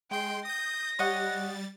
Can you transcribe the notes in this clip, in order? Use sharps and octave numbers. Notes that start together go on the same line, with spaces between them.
G#3 G5 C6
D#6 G6 A#6
G3 C#5 D#5 F#5 A6